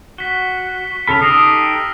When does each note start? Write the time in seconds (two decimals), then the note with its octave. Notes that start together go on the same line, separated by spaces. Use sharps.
0.18 F#4 B6 G7
1.07 C#3 A4 B5 F6 F7
1.21 D#4 G4 A4 D#6 E6 A#6 C7